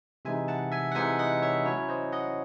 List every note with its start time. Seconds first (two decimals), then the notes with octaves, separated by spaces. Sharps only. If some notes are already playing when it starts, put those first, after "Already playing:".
0.25 C3 E3 G#3 D#4 E5 G#5
0.48 F#5 A5
0.72 E5 G#5
0.92 F#5
0.95 C3 E3 G#3 D#4 E5 G#5
1.19 D#5 F#5
1.42 C#5 E5
1.65 F#3 C#4 E4 C#5
1.88 C5 D#5
2.12 D#5 F#5